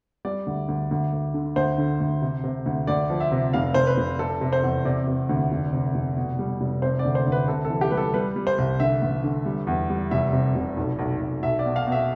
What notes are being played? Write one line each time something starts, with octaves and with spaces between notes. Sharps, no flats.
G3 D5
D2
D2
D2
D2
D3
D2 C5
D3
D2
C3
C3
D2
D2 D5
F3
E5
C3
F1 F5
F1 C5
B4
F1
C3 A4
C3
C5
E2
C3 D5
C3
D2
F1
C3
F1
B2
G3
F1
C3 C5
D5
D2
C5
D2
B4
C3 A4
A4
E3
G4
G3 B4
A4
G3 B4
G3
C5
C2
D3 E5
A1
D3
G3
E2
G3
F1 E5
C3
F1
B1
B1
B1
B1 E5
D5
B2
F5
B2
E5